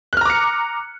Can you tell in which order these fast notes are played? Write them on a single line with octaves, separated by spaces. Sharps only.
F#6 F6 A#5 D6 C#7